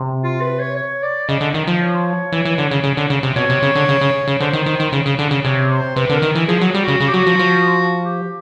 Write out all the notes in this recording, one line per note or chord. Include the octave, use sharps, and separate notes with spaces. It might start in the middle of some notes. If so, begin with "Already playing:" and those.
Already playing: C3
F4
B4
C#5
C#5
D5
C#3 D#5
D3
D#3
F3
C#5
E3
E3
D3
C#3
C#3
D3
C#3
C3
B2 C#5
C3
C#3
D3
C#3
C#3
C#3
D3 C5
D#3
D#3
D#3
C#3
C#3
D3
C#3
C3 C#5
C5
C3 B4
D3
A#4
D#3
E3
F3 G#4
F#3
G3
F#4
C#3
C#3 F#4
G4
F#3 F#4
F3
F3
G4